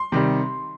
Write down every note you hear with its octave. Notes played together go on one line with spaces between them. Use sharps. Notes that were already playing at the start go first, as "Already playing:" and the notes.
Already playing: C6
C3 D#3 G3